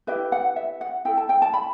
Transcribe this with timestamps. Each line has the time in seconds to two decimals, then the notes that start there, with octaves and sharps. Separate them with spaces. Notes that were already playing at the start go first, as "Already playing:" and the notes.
0.07 E4 G4 B4 E5
0.32 F#5
0.56 E5
0.81 F#5
1.05 E4 A4 G5
1.17 A5
1.29 G5
1.42 A5
1.54 B5